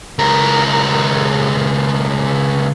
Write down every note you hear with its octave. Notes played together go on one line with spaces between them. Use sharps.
C#2 A#4